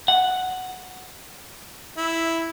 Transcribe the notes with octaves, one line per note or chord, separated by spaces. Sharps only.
F#5
E4